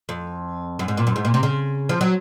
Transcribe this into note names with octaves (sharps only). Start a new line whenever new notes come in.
F2
F#2
G#2
A#2
F#2
G#2
A#2
C3
C#3
F3
F#3